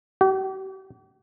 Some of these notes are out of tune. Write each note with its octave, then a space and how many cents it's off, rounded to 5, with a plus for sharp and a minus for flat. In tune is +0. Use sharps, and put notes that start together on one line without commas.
G4 -45